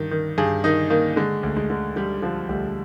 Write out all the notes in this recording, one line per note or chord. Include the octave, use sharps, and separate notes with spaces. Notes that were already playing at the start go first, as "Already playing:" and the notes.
Already playing: G2 D#3
D#3
G2 G#4
D#3 D#4
D#3 A#3
D3 G#3
D2
G#3
D3
D3 G3
D3 F3
D2 G3